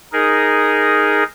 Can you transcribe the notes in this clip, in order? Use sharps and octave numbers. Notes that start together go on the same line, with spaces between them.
D#4 G#4 A#4